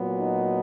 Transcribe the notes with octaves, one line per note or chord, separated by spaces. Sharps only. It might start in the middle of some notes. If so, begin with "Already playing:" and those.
Already playing: A#2 F#3 B3
D#4